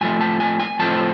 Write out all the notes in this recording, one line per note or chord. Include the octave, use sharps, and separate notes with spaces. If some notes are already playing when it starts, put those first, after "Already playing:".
A2 F3 A3 C4 G#5
A5
G#5
G#5
A2 F3 A3 C4 A5